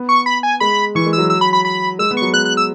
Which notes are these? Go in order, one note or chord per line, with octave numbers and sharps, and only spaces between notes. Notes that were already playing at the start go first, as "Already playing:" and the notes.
Already playing: B3
C#6
B5
G#5
G#3 B5
E3 C#6
G#3
E6
F#3
E6
B5
B5
B5
G#3 E6
B3
F#3 C#6
G#3 F#6
F#6
E6